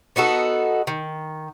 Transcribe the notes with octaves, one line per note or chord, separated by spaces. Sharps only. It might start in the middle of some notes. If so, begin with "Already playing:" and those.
B3 D#4 F#4 A4
D#3